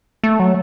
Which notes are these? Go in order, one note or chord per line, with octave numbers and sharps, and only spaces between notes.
A3
F#3